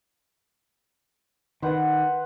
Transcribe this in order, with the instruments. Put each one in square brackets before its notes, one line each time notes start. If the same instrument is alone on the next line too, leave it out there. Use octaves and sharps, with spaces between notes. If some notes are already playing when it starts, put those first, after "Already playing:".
[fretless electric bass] D#3 [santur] B4 C5 F#5